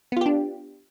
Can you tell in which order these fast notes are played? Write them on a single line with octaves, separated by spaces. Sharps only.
B3 F4 G4 D4